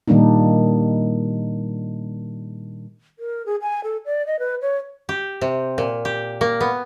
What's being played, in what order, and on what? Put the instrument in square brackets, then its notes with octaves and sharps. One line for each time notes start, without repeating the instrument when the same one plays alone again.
[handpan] A#2 D#3 G3 A#3 D4 D#4
[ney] A#4
G#4
G#5
A4
D5
D#5
B4
C#5
[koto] G4
C3
A#2
G4
A#3
B3